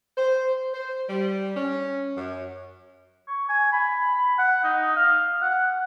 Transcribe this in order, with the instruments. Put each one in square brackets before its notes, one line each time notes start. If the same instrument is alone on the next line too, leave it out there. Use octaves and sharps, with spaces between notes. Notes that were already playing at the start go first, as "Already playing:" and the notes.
[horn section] C5
C5
G3
C#4
F#2
[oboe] C#6
G#5
B5
F#5
D#4
F5
F#5